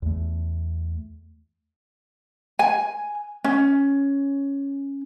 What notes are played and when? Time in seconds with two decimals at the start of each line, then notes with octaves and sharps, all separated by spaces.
0.02 E2 A3
2.59 G#5
3.44 C#4